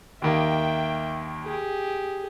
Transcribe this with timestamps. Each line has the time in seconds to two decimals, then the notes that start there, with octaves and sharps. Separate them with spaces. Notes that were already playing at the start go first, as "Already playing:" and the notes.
0.22 D#2 D#3 A#3 E5 G5
1.44 G4 G#4